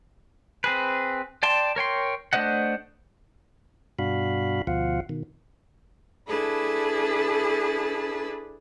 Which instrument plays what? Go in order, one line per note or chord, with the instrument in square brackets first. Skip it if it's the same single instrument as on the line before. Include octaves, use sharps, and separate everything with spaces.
[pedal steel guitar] C4 G#4 B4
D5 G5 A5 C6
A#4 C#5 G5 C6
A3 D4 C5 D#5 F#5
[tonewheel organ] G2 B2 D4 F#4 F5 B5
D2 B2 F3 F4 F5 F#5
B2 D#3
[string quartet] D4 E4 G#4 A4 B4 A5